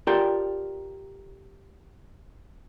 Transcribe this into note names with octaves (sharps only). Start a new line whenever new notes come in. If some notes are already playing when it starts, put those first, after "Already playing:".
F4 G4 A4 A#4 D5 G5